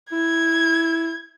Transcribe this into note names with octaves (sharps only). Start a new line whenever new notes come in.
E4 G#6